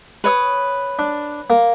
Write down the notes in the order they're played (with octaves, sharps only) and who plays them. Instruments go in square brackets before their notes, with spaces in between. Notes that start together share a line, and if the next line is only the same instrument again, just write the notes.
[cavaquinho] B4 C#5 D#6
[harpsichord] D4
A#3